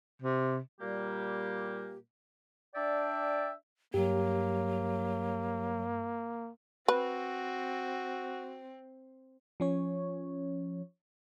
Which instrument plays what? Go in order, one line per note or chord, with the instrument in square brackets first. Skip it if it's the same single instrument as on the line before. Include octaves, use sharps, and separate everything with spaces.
[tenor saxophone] C3
[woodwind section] A#2 G3 A#3 G4
D4 D5 E5 G5
[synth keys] G2 [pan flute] F#3 [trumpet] A#3 [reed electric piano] G4
[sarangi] C4 [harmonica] F#4 [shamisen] B4
[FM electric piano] F3 C#4 C#5